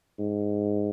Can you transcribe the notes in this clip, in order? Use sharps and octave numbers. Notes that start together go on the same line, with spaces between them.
G#2